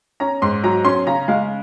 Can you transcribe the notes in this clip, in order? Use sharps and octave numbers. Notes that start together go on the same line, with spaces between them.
C#4 A#5
G#2 C6
F#3 A#5
C#4 C6
C#3 A#5
G#3 F5